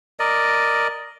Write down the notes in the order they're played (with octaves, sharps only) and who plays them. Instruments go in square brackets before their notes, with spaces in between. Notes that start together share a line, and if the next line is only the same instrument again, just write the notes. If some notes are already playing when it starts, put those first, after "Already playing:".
[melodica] A#4 D5 D#5